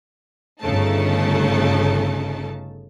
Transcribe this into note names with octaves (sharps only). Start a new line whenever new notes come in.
G1 C#3 A3 D#4 A5